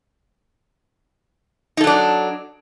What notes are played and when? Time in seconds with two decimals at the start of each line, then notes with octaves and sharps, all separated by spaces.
1.77 D#4
1.81 A4
1.84 F#3
1.87 D4